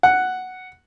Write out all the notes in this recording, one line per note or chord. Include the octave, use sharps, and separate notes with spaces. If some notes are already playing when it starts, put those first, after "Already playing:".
F#5